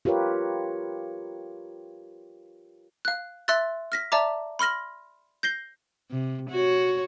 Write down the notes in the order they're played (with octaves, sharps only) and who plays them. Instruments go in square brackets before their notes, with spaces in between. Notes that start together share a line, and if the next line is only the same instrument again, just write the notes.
[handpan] F4 G4 A#4 B4 C#5
[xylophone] F5 F#6
E5 C6 E6 F#6 A6
F6 A#6 B6
D5 E5 A5 A#5 D6
B5 C6 F6 A#6 F#7
G6 A#6 C7 G7
[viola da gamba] C3
F#4 C#5